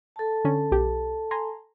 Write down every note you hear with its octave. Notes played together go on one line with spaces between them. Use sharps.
A4 A5
D3 C#4
B1 G4
G#5 A#5 C6